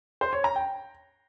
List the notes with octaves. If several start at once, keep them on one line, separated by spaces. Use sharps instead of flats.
C5
C#5
A#5
G5